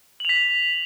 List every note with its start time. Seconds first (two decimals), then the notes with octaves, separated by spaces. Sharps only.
0.20 F#7
0.25 F7
0.29 B6